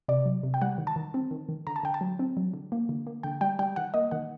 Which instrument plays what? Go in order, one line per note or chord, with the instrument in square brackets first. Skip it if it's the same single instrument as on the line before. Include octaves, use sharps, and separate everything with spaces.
[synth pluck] C3 D5
F#3
C3
G5
G3 F#5
D#3
A5
D#3
C4
D#3
D#3
D3 A#5
A5
D3 G5
A5
F#3
C4
F#3
D3
A#3
D3
A#3
D3 G5
G3 G5
G3 G5
D#3 F#5
A#3 D#5
D#3 F#5